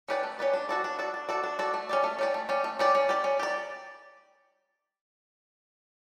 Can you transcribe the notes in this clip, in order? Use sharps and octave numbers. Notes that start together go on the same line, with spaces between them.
C#4 G4 B4 D5
A3
C#4 G4 B4 D5
D4
F#4 A4 D5
D4
F#4 A4 D5
D4
F#4 A4 D5
D4
F#4 A4 D5
A3
C#4 G4 D5
A3
C#4 G4 D5
A3
C#4 G4 D5
A3
C#4 G4 D5
C#4
G4 D5
C#4
G4 D5